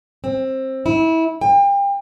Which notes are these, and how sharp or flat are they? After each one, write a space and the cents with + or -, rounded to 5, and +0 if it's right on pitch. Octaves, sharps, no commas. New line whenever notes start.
C4 +15
E4 -25
G5 +35